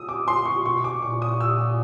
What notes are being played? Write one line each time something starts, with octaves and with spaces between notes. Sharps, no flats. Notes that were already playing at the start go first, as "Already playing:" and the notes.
Already playing: D#6 E6
D6
C6
C#6
B2 C#6
D6
A#2 C#6
D#6
E6